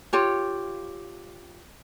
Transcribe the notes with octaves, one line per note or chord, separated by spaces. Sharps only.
F4 G4 C#5